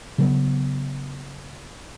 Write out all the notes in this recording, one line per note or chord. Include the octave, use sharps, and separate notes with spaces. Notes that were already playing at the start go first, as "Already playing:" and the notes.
C#3 F#3 B3